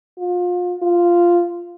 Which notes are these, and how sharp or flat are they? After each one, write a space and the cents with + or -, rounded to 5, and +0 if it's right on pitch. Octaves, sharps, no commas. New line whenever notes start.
F4 +30
F4 -5